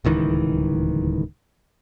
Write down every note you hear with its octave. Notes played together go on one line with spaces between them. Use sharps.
D1 C#2 D#3 E3